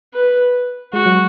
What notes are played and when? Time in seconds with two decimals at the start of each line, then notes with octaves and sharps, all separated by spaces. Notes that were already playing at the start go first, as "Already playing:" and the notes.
0.14 B4
0.93 G#3 F#4
1.06 F#3